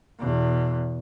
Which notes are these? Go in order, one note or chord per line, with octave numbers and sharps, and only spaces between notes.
E2 B2